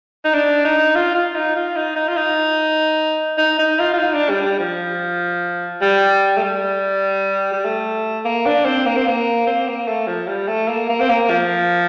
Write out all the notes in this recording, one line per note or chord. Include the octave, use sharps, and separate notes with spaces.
D#4
D4
D#4
F4
F4
D#4
F4
D#4
D#4
F4
D#4
D#4
D#4
F4
F4
D#4
D4
G3
G3
F3
G3
A3
G3
G3
A3
A#3
D4
C4
A#3
C4
A#3
C4
A#3
A3
F3
G3
A3
A#3
A#3
C4
A#3
F3